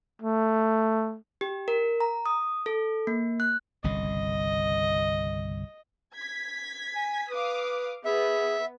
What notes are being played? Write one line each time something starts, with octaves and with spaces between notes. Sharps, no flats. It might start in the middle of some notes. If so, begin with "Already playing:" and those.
A3
G4
A#4
A#5
D#6
A4
A#3
F#6
G1 C2 C#3 D#5
G#6 B6
G#5
B4 F5 D6 D#6
B3 G#4 E5